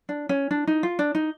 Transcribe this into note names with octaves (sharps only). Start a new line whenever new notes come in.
D4
C#4
D4
D#4
F4
D4
D#4